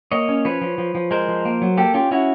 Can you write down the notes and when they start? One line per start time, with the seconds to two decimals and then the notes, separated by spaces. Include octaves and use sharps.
0.12 A#3 C#5 D#5
0.29 C#4
0.45 F3 B4 C#5
0.61 F3
0.78 F3
0.95 F3
1.11 G#3 A#4 C5
1.29 F3
1.45 A#3
1.62 F#3
1.77 A#3 G4 A4
1.94 C#4 F4 G4
2.11 C#4 E4 F#4